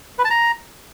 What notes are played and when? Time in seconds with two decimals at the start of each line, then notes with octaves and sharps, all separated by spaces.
0.19 B4
0.24 A5
0.30 A#5